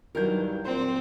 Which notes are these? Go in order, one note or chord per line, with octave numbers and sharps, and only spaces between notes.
G2 D#3 E3 F#3 A#4 G6
A#2 C4 C5